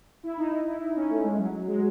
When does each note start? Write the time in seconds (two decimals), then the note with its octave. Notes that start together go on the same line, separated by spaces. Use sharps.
0.23 E4
0.38 D#4
0.52 D#4
0.67 E4
0.81 D#4
0.96 C#4
1.09 A3
1.24 G#3
1.38 F#3
1.67 G#3